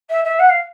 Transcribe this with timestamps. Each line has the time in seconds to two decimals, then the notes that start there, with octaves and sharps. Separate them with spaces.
0.09 E5
0.24 E5
0.39 F#5
0.49 F5